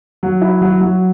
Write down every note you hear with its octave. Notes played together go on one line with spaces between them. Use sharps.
F#3
E4
F#3
F#3